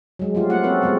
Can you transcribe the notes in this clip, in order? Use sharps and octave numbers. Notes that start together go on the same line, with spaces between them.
F#3 G#3
F3 A3 F4 G4
A3 A#3 C#4 F4 F#5
C4 C#4 F#4 A4 B4
F3 G#3 B3 C4